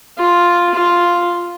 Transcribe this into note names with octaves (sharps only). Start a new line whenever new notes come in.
F4
F4